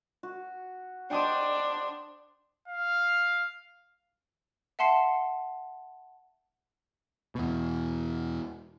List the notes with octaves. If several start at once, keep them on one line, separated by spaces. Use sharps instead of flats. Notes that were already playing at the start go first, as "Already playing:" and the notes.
F#4
D4 C5 D#5 G5
F5
E5 F#5 A5 C6 C7 C#7
E2 B2